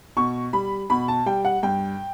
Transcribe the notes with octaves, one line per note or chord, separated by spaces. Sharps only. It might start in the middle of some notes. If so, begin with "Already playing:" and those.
B2 C#6
G3 B5
B2 B5
A5
G3 G5
F#5
G2 G5